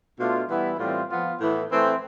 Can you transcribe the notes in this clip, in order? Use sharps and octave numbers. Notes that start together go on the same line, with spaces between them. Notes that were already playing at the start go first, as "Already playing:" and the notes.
B2 A3 D4 F4
E3 G3 B3 E4
A2 E3 G3 C4 F4
F3 B3 F4
A2 E3 B3
E3 A3 C4